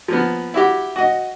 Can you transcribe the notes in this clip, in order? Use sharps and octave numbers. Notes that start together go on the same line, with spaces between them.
F3 A#3 B3
E4 F#4 G4
F#4 D#5